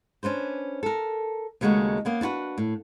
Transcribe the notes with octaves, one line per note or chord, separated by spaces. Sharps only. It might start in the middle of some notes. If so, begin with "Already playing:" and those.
C#4 D4 B4 C5
A4 A#4
D#2 C#3 G#3 A3 F#4
A#3 B3 C#4
D4 E4 F#4 B4
A2